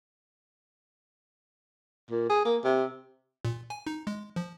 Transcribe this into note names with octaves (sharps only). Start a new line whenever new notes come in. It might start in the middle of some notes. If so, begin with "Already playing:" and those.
A#2
G#4
A#3
C3
A#2
G#5
D#4
G#3
F3